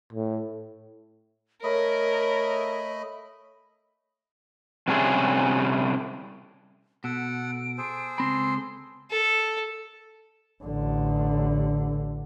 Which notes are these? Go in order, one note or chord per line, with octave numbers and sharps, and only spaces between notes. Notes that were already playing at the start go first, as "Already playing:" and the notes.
A2
A3 A#4 C#5 D#5 B5
C3 G3 C#4 D4 G#4
B2 A4 F#5 D7
G#4 A4 C5
C#2 C4 B5 C6
A4
A1 D3